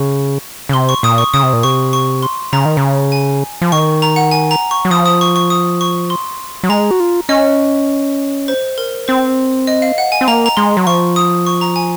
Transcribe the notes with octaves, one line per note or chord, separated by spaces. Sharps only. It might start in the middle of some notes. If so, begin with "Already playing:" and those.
Already playing: C#3 C#6
C#3
C3 C6
C#6
A#2 D#6
C#6
C#3 D#6
C3
A#2
C3 C#6
C#6
C6
C#3 A#5
D#3
C#3
G#5
F3
D#3 C#6
A#5
F#5
G#5
A#5
C#6
F#3
F3 D#6
D#6
C#6
C#6
D#6
C#6
C6
F#3
G#3 A#5
F#4
F4
C#4 D#5
C5
A#4
C4 C5
D#5
F5
F#5
G#5
C4
A#3 A#5
A#5
G#3 C6
F#3
F3 C#6
D#6
C#6
A#5
G#5